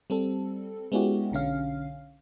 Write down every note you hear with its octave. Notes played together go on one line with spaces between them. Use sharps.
G3 C4 A4
G#3 B3 C#4 E4 F#4 G4
B1 D3 C#4 F5